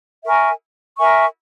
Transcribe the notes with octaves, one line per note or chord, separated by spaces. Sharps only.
A#4 E5 G#5 C#6
A#4 E5 G#5 C#6